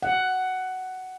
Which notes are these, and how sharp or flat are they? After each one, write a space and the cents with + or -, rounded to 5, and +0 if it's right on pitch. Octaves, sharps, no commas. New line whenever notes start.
F#5 +10